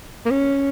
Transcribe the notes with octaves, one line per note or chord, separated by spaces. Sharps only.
A#3
C#4